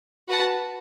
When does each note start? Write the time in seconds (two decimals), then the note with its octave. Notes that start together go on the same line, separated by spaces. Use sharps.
0.28 F#4 B4 F#5 A5